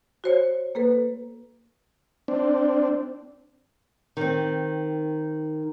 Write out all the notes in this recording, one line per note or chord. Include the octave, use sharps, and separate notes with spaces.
F#4 C5 C#5
A#3 A4 B4
C4 D4
D#3 C4